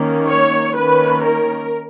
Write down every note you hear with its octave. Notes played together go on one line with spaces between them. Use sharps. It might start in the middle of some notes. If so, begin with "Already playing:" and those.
Already playing: D#3 A#3 C#4
C#5
D#3 A#3 C#4 B4
A#4